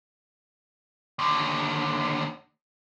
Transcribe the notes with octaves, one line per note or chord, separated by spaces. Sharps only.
D#2 D3